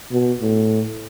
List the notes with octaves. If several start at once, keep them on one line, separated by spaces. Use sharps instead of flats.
B2
A2